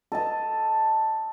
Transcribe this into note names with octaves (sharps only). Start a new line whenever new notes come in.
A4 D#5 A5